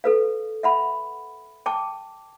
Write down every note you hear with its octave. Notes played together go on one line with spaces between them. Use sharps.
A4 B4 F5
E5 F#5 B5
G5 A5 D6